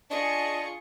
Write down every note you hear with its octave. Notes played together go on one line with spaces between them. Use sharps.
D4 F4 G#4 D#5 C#6